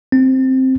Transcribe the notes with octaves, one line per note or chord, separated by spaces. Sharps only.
C4